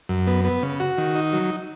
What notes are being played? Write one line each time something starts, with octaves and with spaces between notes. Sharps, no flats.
F#2
B3
B3
C#3
F#4
D#3
D#4
F#3